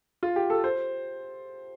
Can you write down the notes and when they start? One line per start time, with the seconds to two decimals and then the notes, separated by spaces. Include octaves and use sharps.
0.23 F4
0.36 G4
0.50 A4
0.64 C5